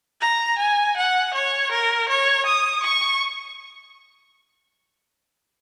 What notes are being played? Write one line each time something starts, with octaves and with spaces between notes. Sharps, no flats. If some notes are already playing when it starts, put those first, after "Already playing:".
A#5
G#5
F#5
C#5
A#4
C#5
D#6
C#6